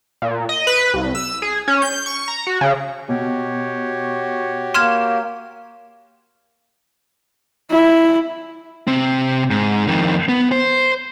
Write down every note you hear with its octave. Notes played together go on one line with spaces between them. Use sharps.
A#2
D#5
B4
C2
E6
G#4
C#4
G6
C#6
A#5
F#4
C#3
B2 F#4 G4 C#5
A#3 C6 F6 G#6 E7
E4
C3 C4
G#2
F2 D#3
B3
C5